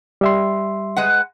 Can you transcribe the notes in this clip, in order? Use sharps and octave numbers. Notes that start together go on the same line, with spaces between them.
G3 E5 C6
G#3 B4 F#5